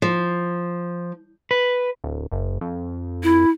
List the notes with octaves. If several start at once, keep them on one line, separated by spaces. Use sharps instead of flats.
F3
B4
D1
F#1
F2
E4